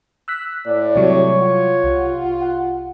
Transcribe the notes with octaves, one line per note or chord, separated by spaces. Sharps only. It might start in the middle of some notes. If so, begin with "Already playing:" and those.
E6 F#6 B6
A2 D5
C3 F#3 G3 C#5
F4 F#5
C2
F#5